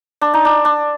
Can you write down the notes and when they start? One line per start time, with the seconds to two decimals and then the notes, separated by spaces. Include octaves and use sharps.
0.21 D4
0.34 D#4
0.45 D4
0.65 D4